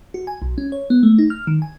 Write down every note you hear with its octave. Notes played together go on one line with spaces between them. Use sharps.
F#4
G#5
B1
C#4
C#5
B3
A3
D#4
F6
D#3
G#5